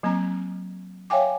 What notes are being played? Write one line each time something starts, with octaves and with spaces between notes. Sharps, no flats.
F#3 A#3 C4 A#5
C#5 E5 F5 G5 G#5 D6